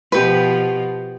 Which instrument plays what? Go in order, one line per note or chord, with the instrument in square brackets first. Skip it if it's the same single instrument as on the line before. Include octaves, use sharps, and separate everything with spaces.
[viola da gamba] B2 F3 [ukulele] G4 B4